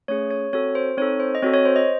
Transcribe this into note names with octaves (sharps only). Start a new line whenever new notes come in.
A3 C#4 G#4 C#5
C#5
C4 F#4 A4 C#5
C5
C4 D#4 A4 C#5
C5
D#5
C4 F#4 A4 C#5
C#5
C5
D#5